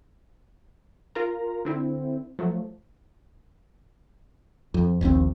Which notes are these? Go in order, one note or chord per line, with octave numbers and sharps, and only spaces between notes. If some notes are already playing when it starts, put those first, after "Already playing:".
F4 A#4 A#5
D3 C4 E4
F3 F#3 A3
F2
D#1 A#1 D#2 C4